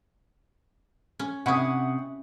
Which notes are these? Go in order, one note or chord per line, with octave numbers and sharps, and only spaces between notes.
C#4
C3 C#4 E4 F#5 C#6 D#6